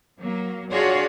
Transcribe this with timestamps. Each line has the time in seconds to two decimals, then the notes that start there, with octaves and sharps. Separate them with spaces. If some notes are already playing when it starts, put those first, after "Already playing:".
0.19 F#3 A#3
0.72 D4 F4 F#4 G#4 C#5 D5